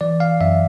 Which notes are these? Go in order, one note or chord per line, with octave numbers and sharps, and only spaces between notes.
E3 D5
F5
F#2 E5